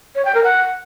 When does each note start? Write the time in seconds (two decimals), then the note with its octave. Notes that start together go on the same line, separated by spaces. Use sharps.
0.16 C#5
0.25 G5
0.35 A#4
0.44 F#5